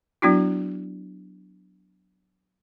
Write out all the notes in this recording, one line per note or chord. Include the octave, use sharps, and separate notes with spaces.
F#3 B3 D4 E4 F#4